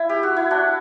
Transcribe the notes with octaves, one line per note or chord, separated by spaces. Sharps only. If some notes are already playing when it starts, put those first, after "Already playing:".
Already playing: E4
G4
F#4
E4
D4 F#4